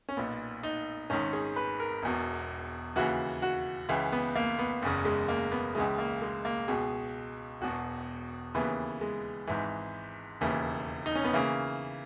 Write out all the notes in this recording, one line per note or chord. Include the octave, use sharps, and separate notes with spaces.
C#4
B1 A#2 B3
D#4
G#1 G#2 D#3 C#4
G#4
B4
A#4
E1 E2 B2
D#2 C#3 E3 F#4
F#4
C#2 C#3 E3
B3
A#3
B3
F#1 E2 C#3
G#3
A#3
B3
C#2 C#3 E3 G#3
A#3
G#3
A#3
C#2 B2 G#4
E1 E2 B2 F#4
D#2 C#3 E3 B3
G#3
G#1 G#2 E3
E1 D#2 C#3 E3
D#4
C#4
B3
C#3 E3 A#3